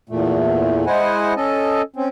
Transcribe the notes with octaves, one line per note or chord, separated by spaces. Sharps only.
E2 A#2 A3
G#3 E4 C5 D#5 F#5 G#5
C#4 A4 D#5
C4 C#4